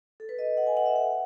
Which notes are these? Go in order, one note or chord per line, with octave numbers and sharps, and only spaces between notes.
A4
B4
D#5
F#5
G#5
F#5
E5
F#5